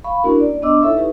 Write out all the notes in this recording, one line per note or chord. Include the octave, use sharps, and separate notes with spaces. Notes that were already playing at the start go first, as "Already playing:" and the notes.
F5 B5 C#6
A#3 C#4 D4 E4 F#4 A#4
D5
B3 D4 D#5 D6 E6
D#4 E4 A4 C#5 E5 C#6
D#4 G4 B4